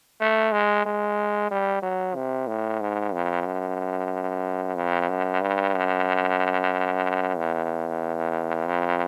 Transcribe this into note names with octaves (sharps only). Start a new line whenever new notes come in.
A3
G#3
G#3
G3
F#3
C3
A2
G#2
F2
F#2
F2
F#2
G2
F#2
E2
F2